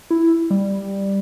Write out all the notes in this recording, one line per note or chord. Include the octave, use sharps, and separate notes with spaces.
E4
G3